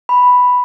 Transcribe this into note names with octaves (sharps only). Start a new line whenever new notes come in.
B5